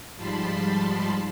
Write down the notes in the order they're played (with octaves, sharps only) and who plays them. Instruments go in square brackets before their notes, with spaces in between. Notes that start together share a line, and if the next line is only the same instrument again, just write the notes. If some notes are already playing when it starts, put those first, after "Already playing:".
[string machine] G#2 F3 G3 A5 B5 C6